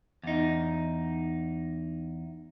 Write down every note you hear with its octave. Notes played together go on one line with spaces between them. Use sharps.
E2 D#4